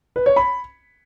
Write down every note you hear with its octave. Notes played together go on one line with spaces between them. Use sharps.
B4
C#5
B5